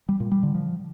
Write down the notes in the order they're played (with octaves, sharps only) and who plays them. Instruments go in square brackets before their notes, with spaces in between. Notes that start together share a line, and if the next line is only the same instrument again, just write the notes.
[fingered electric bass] G3
A#2
G3
D3
F3